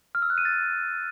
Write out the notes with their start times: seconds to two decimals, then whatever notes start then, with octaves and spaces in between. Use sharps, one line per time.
0.15 F6
0.22 E6
0.30 F#6
0.38 D#7
0.45 A6